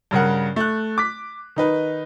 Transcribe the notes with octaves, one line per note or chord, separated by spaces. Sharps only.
G2 C#3 A#4 F#5
A3 F#6
D6 B6
D#3 D#4 B4